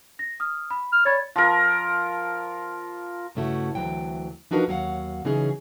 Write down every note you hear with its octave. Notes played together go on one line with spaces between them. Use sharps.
A#6
D#6 F6
B5
F6
C#5 D5 B5 A6
F3 A#4
G2 C#3 A3 E4 F#4
D2 E3 F#3 G5
F3 D4 D#4 F#4 A#4 B4
D#2 F#3 F5 F#5
C#3 E3 F#3 C#4 D#4 G#4